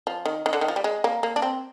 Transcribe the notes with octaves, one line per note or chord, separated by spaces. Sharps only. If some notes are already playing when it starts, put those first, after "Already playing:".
F3
D#3
D#3
D3
D#3
F3
G3
G#3
A#3
A#3
D4
C4